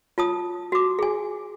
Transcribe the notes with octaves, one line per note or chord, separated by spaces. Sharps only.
F4 A5 D#6
F#4 D6
G#4 G#5